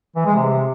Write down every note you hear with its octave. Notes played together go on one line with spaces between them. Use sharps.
E3
G#3
C3